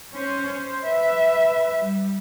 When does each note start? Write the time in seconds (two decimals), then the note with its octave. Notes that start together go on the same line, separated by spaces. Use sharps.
0.13 C#4 C5
0.49 C5
0.84 B4 E5
1.78 G3